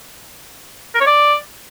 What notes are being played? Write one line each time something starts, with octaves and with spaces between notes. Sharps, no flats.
A#4
C#5
D5